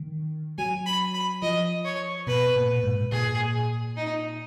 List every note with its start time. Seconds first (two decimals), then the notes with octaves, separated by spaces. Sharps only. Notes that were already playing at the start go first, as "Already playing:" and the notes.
Already playing: D#3
0.58 F#3 G#5
0.86 B5
1.14 B5
1.42 F3 D#5
1.85 C#5
2.27 B2 B4
2.56 A#2
2.83 G#2
3.11 A#2 G#4
3.96 D#4